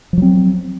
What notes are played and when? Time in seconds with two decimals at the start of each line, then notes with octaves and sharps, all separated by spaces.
0.13 F3
0.18 F#3
0.22 C4